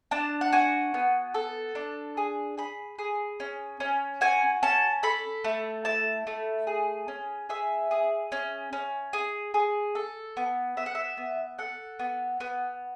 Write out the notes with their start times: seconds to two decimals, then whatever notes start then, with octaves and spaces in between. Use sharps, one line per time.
0.11 D4 A5
0.41 F#5
0.52 F#4 G#5
0.94 B3
1.34 A4
1.75 D4
2.17 G#4
2.58 G#4 B5
2.99 G#4
3.40 C#4
3.80 C#4
4.21 F#4 G#5
4.63 C#4 A5
5.03 A4 B5
5.44 A3
5.85 E4 A5
6.27 A3
6.67 G#4
7.08 C#4
7.49 G#4 E5
7.91 G#4
8.32 C#4
8.73 C#4
9.13 G#4
9.54 G#4
9.95 A4
10.37 B3
10.77 B3 E5
10.86 F#5
10.95 E5
11.17 B3
11.58 A4 F#5
11.99 B3
12.40 B3